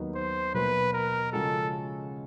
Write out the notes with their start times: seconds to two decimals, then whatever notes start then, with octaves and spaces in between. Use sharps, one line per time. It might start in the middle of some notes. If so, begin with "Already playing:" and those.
Already playing: D#2 D#3 F#3 B3 D#4
0.15 C5
0.54 B2 F#3 A#3 B4
0.93 A#4
1.33 C#3 F3 G#3 C#4 F#4 A4